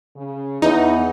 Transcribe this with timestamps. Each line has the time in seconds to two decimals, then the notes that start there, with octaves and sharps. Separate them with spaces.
0.16 C#3
0.62 E2 B3 D#4